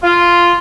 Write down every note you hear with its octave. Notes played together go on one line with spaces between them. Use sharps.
F4